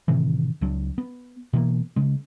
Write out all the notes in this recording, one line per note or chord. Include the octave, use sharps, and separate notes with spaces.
A2 C3 D#3 E3
C#2 F#3 D4
B3
B2 E3 A#3
C#3 G#3